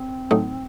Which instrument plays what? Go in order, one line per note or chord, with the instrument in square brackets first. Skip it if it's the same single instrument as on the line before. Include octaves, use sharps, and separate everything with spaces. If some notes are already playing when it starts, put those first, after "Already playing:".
Already playing: [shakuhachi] C4
[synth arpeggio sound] A2 F#3 A3 D#4